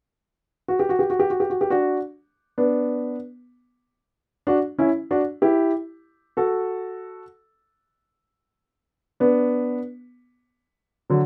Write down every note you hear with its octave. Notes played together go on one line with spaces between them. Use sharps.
F#4
G4
F#4
G4
F#4
G4
F#4
G4
F#4
G4
D4 F#4
B3 D4
D4 F#4
C#4 E4
D4 F#4
E4 G4
F#4 A4
B3 D4
D3 F#3